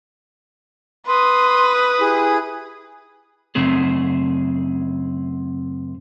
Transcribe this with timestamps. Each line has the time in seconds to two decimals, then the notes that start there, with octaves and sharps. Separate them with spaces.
1.07 B4 C6 D#6
1.98 E4 G4 G#4
3.55 F#2 C#3 A3 C4 G#4